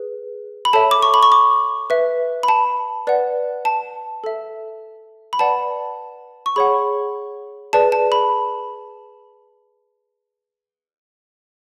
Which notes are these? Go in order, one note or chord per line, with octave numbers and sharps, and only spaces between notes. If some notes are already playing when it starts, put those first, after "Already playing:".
Already playing: G#4 B4
B5
A4 C#5 E5 A5
D6
C#6
B5
C#6
D6
B4 E5
B5
A5
B4 D5 F#5
A5
A4 E5
B5
B4 D5 F#5 A5
C#6
G#4 C#5 F#5 B5
G#4 B4 D5 A5
A5
B5